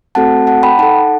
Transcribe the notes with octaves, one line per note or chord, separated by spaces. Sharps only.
A3 C4 F#4 A4 F#5 A5
F#5 A5
G5 B5
D#4 A4 F#5 A5